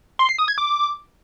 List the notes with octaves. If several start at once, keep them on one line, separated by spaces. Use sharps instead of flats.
C6
C7
D#6
G#6
D6